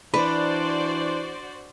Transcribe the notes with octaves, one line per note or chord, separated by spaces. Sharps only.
E3 D4 F#4 B4 C5 D5